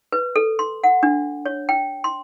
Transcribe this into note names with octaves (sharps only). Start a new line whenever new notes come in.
B4
A4
C6
F#5
D4
C#5
G5
C6